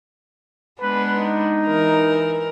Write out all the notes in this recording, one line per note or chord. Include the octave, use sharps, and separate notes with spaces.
G#3 B3 D4 B4
D#4
E3 A#4